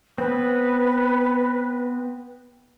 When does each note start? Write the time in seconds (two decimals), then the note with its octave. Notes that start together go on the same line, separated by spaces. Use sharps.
0.18 B3 C4 B4